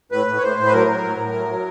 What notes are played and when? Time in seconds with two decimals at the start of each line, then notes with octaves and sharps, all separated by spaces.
0.12 A2 B4
0.27 A2
0.38 C#5
0.42 A2 C5
0.57 A2
0.66 B4
0.73 F#3 A#4
0.88 F#3
1.03 A2
1.18 A2
1.33 F#3
1.49 F#3